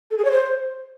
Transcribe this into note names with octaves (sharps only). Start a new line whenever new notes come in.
A4
G#4
C#5
C5